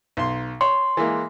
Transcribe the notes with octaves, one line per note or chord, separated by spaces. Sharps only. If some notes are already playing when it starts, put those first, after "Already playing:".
B1 C6
C#5 C6
E3 G#3 A#3